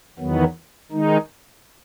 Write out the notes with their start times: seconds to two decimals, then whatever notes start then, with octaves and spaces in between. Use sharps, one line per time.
0.19 E2 D#3 F#3 B3
0.92 D#3 G#3 D#4